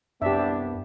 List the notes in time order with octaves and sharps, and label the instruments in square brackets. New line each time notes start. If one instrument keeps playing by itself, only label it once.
[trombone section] C2 B3 [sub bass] F#2 [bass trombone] D4 [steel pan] G4 E5